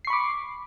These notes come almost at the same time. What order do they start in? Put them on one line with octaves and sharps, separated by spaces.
C7 C#6 B5 D6